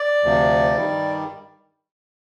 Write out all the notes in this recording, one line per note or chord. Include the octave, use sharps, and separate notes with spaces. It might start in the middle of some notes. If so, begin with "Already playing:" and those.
Already playing: D5
D2 C3 F3
G2 D#3 G3